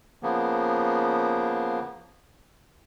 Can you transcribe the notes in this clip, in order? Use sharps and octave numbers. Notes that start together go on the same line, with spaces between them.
C#3 F3 A#3 B3